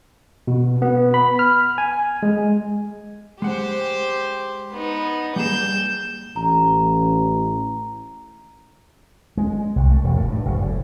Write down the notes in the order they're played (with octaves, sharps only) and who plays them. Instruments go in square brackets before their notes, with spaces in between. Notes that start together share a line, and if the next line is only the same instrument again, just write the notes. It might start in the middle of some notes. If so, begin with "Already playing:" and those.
[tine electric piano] B2
B3
B5
F6
G#5
G#3
[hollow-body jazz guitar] G#3 F#5 [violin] G4 C5
[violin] B3 D#4
[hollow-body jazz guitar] G3 A#3 G#4 [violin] G6 E7
[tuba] A1 [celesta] A#5
[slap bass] G#3
C2
A3
E1
A2
G2
F#1
A2